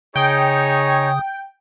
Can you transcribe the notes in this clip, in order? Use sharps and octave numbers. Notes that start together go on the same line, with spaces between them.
C#3 D#4 G#4 C#5 G5 D#6